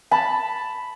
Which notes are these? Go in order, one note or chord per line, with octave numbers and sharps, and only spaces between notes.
A5 B5